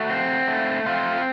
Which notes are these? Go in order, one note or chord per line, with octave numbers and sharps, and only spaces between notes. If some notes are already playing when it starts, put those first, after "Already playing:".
Already playing: A3 F#4
C4
A3
C4 F4